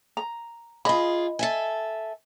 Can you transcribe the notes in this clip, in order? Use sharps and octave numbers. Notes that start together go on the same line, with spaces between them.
A#5
F4 G#4 D#5 B5
A4 E5 G#5